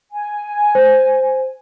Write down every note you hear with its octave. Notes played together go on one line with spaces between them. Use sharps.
G#5
C5